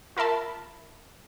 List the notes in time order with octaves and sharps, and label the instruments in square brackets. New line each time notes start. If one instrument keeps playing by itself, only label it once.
[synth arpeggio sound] F4 A#4 E5 A5 B5